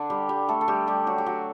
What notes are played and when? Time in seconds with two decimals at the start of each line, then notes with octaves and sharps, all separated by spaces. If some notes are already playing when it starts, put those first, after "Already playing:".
Already playing: D3 D4
0.10 G3 G4
0.29 G3 G4
0.49 A3 A4
0.61 A4
0.68 G3 G4
0.87 G3 G4
1.07 F#3 F#4
1.18 G4
1.26 F#3 F#4